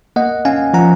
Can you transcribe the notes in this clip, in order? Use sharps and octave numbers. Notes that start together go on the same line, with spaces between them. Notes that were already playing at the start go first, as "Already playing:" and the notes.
A#3 D#5 F#5
C#4 F5 G#5
F3 F#5 A#5